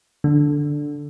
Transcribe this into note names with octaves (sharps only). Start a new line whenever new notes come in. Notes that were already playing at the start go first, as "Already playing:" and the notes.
D3